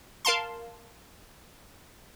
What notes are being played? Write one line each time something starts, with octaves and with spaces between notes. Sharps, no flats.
A#4 F5 A5 C6